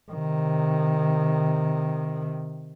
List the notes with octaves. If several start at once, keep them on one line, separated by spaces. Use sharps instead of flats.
C3 D#3